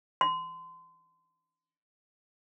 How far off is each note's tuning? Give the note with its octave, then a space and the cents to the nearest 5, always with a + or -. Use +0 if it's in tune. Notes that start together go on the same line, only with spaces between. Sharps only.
C6 -30